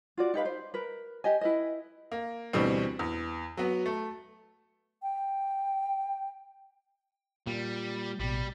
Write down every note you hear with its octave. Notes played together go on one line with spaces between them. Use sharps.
F4 F#4 D5
D#4 G4 B4 F5
C5
A#4 B4
G4 D#5 G#5
E4 B4 D#5
A#3
D2 B2 E3 G3 C4
E2
F#3 B3
A3
G5
A#2 G3
A1 B2 G3